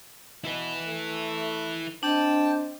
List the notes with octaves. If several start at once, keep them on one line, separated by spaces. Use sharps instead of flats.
B2 E4 B4
A3
C4 D4 D#5 G5 A5